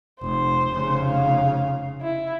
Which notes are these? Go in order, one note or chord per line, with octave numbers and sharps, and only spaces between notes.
F1 C5
F1 C#3
F5
E4